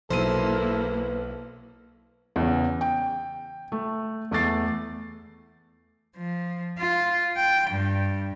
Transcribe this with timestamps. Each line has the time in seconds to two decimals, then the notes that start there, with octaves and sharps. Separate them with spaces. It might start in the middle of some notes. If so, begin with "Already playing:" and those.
0.10 B1 A#3 B3 E4 A4 C5 D#7
2.36 E2 C#3
2.81 G5
3.72 A3
4.31 E2 A3 D6 A6 C7
6.16 F3
6.78 F4
7.36 G5
7.70 G2